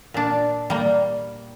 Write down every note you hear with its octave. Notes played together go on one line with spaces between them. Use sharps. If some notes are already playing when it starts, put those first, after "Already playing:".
A#2 D4
G3 A#3